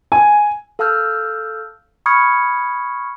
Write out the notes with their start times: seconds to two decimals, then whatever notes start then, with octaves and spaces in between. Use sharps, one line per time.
0.12 G#5
0.79 A4 F5 A5 E6 F6 G6
2.06 B5 C#6 D#6 F6 G#6 C#7